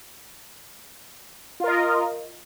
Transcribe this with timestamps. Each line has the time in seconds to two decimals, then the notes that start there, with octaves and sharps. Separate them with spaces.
1.60 F4
1.64 A#4
1.68 D#5